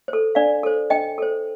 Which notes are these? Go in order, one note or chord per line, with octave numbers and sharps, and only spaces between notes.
C5
A4
D4 D5 F5
A4 C5
D4 D#5 G5
A4 C5